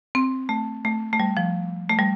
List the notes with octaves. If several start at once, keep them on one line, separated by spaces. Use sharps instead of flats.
C4
A3
A3
A3
G3
F3
A3
G3